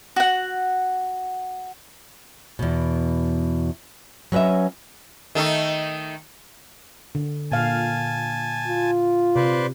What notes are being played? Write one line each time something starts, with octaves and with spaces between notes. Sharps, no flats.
F#4 F#5
E2 B2
F#3 C#4 B4 D#5 E5
D#3 A3 D#4
D3
A#2 F5 G#5 A5
F4
C3 B4 C5 D5